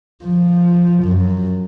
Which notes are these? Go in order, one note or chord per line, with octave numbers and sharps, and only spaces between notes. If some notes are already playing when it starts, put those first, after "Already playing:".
F3
F#2